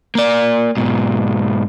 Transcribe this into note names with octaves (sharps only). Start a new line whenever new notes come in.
A#3 D5
G#2 B2